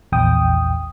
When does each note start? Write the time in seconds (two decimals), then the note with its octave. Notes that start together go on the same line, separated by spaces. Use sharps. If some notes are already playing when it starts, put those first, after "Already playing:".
0.12 A#1 E2 G5 D#6